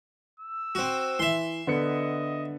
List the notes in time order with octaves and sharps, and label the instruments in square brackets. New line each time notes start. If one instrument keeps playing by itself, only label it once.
[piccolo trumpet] E6
[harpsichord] C4 F#4
[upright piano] E3 [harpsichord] E5 C6
[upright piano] D3 B3 C#7 [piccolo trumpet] D#5